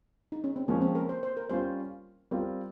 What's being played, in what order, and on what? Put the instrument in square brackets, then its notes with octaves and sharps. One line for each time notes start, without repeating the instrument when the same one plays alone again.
[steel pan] D#4
C#4
C4
[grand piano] F3 G#3 C#4 [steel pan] A#3
[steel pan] C4
A#4
C5
C5
A#4
[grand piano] G3 C#4 F4 [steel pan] C5
[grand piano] G3 C4 F4 [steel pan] A#4